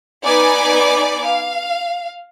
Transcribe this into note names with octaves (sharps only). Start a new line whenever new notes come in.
B3 D#4 B4 D5 G#5 D6
F5